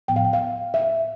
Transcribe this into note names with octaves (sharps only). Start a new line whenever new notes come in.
A2 F3 B3 G5
F5
G5
F5
E5